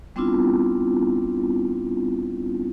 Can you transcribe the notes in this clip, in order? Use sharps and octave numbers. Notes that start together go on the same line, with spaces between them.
G3 B3 C4 D4 E4 F4